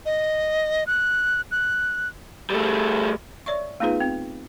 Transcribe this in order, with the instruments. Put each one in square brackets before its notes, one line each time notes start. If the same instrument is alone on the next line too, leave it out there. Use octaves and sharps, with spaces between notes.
[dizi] D#5
F#6
F#6
[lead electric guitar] G3 A3
[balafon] C#5 D5 E5 C#6
A3 B3 D#4 F4 G#4 B4
C4